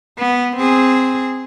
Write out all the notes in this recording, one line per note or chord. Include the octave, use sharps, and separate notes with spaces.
B3
C4 G#4